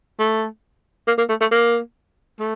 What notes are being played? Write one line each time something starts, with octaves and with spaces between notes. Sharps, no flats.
A3
A#3
A#3
A3
A3
A#3
A3